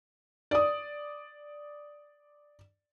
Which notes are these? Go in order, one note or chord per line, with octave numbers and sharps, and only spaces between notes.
D5 D#6